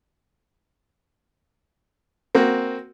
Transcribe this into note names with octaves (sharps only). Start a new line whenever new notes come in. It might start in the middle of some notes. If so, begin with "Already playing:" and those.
A#3 C4 F#4